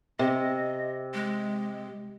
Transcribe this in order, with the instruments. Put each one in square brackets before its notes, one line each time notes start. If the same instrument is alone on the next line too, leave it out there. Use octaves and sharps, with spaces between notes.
[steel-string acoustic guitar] C3 [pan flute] D#5
[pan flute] G#3